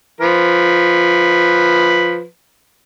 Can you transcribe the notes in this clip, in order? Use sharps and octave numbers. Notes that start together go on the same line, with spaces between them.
F3 B4